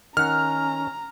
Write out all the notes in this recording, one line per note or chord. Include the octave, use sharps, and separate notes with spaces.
D#3 C#4 F#5 A#5 F6